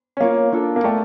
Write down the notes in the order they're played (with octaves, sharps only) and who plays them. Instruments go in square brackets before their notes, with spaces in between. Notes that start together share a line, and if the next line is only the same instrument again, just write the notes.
[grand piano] C#4
[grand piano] A#3 [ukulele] F4 C#5 F5
[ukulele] D4 F4 A4
[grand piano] A#3
[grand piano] A3 [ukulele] A#4 D5 G5 A#5